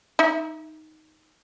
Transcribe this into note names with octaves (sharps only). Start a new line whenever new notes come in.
D#4 E5